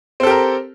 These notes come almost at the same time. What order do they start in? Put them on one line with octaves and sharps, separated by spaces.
C4 A4 G4 A#4